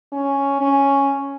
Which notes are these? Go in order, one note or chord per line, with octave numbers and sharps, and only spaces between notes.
C#4
C#4